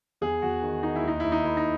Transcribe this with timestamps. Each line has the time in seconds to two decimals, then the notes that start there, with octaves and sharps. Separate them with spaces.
0.21 E2 G#4
0.42 E2 F#4
0.62 D#3
0.83 D#3 D#4
0.95 E4
1.03 D#2 D#4
1.20 D#2 E4
1.32 D#4
1.44 D#3 E4
1.57 D#4